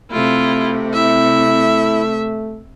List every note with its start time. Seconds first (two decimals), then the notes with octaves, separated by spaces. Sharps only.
0.12 C3 A3 E4 F4
0.94 E4 E5